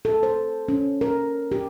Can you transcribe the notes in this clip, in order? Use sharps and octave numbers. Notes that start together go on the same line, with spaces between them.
A4
C5
C#4
A#4
G4